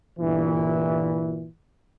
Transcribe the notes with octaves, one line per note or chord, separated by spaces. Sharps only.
G1 A#2 E3